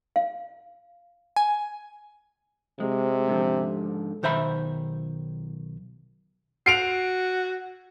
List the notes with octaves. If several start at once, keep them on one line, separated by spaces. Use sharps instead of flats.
F5
G#5
C3 G#3
G#2 D3 F3
B1 D#3 C5 E5 B5
F#4 C7 D7 F7